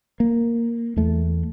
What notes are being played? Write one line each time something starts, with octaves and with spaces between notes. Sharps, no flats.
A#3
E2 A3